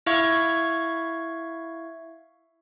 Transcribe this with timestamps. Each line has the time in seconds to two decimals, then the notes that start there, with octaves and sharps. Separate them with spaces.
0.06 E4 E5 F5 C#6 G#6